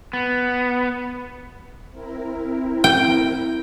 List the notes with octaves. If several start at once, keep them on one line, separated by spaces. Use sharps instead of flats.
B3
C4 E4 A#4
G5